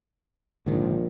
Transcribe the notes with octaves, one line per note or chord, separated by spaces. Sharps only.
A#1 G#2 D3 D#3